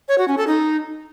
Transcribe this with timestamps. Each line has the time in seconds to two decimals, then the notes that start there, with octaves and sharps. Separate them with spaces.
0.08 C#5
0.18 F#4
0.28 C#4
0.38 A4
0.47 D#4